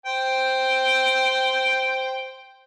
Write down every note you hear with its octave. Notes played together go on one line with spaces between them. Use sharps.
C5 G5